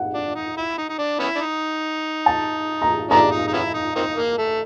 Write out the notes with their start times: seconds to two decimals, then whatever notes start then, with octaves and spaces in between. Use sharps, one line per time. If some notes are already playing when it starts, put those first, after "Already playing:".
Already playing: F#5
0.13 D4
0.35 D#4
0.57 E4
0.78 D#4
0.89 D#4
0.98 D4
1.19 B3 C#4 E4
1.35 D4
1.41 D#4
2.26 A5
2.82 A#5
3.11 A3 B3 D4 A#5
3.31 D#4
3.48 D#4
3.53 B3 C#4 E4
3.74 D#4
3.96 A#3 C4 D#4
4.17 A#3
4.38 A3